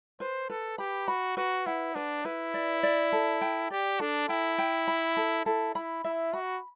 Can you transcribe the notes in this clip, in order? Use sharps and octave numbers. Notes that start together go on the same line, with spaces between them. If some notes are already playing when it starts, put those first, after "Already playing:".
B4 C5
A4 B4
G4 B5
F#4 B5
F#4 B4
E4 F#5
D4 B4
E4 B4
D5
D5
A4
G5
G4 D5
D4 A4
E4 G5
G5
B5
A4
E4 A4
E4 B5
E4 E5
F#4 B5